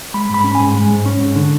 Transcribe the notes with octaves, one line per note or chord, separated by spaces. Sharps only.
G#3 B5
G#2 B5
C#4
G#2 G#5
G#3
G#2
C#4
G#2
D3